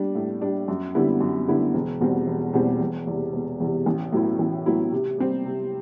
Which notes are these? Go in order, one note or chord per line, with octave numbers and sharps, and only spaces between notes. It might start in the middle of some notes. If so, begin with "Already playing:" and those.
Already playing: G3 D4
A2
G3 D4
F#2
D3 G3 B3 E4
F#2
D3 G3 B3 E4
E1
E2 B2 G3 C4
E1
E2 B2 G3 C4
E1
E2 C3
E1
E2 C3
A1
A2 F#3 B3 E4
A1
A2 F#3 B3 E4
C3
G3 C4
C3